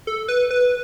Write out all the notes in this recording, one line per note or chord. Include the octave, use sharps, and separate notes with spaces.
A4
B4
B4